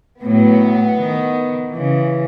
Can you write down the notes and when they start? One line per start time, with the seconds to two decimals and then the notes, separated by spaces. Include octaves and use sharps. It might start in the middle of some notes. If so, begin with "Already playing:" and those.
0.23 A2 F#3 B3
0.99 D#3
1.71 C#3 E3